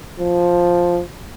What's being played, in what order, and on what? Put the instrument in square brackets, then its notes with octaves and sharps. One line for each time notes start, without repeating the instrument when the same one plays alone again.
[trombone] F3